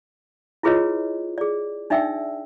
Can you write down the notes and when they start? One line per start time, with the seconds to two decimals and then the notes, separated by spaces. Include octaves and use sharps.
0.63 E4 F4 G#4 B4 C#5 D#5
1.38 G#4 D5
1.90 D4 D#4 D5 E5 G5 E6